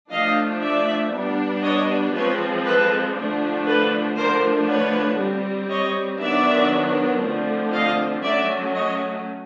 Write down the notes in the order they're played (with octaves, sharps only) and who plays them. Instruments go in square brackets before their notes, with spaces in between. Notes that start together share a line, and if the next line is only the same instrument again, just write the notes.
[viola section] F3 A3 D4 D#5 F5
D5 E5
G3 B3 D4
C#5 D#5
F3 G#3 C4 B4 C#5
A4 B4
D3 F3 A3 D4
A4 B4
D3 F3 A3 D4 A#4 C5
B4 C#5
G3 C4
C#5 D#5
D#3 F#3 B3 D4 D5 E5
D3 F3 A3 C4
D#5 F5
F#3 A3 C#4 D5 E5
C#5 D#5